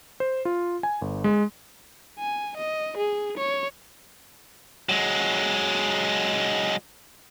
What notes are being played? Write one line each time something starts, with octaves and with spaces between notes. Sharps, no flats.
C5
F4
G#5
G1
G#3
G#5
D#5
G#4
C#5
F#3 G#3